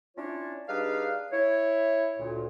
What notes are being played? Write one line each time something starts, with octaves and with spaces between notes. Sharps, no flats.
C#4 D4 E4 F4 C#5
G3 D4 D#4 G#4 B4 F5
E4 C#5
D2 A#2